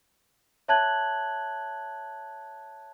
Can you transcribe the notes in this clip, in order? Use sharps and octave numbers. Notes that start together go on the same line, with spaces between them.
C#5 E5 A5 F#6 G#6 F#7